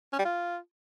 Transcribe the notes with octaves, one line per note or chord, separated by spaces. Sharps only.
C#4
G3
F4